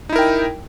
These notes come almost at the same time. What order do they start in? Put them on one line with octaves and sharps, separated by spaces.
D#4 E4 A#4 G5